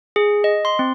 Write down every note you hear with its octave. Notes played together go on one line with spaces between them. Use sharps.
G#4
D#5
C6
C4